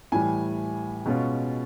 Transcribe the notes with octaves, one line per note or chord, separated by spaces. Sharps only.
A2 E3 G3 G#5
B2 G#3 C#4 F4